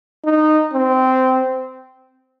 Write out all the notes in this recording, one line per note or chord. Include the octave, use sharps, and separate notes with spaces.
D#4
C4